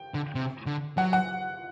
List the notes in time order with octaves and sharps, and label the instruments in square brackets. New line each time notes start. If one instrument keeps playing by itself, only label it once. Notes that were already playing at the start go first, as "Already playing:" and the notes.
Already playing: [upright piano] G5
[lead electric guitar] D3
C3
D3
[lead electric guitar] F#3 [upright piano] F#5
[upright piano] F#5